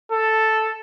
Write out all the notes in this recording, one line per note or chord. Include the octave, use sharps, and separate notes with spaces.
A4